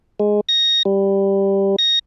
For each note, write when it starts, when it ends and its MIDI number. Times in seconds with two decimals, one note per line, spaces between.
0.20 0.40 56
0.49 0.83 94
0.85 1.76 55
1.79 1.99 94